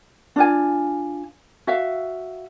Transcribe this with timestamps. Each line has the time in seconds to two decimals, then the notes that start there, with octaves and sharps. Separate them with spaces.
0.36 D4 F4 G#5
1.67 F#4 E5 F5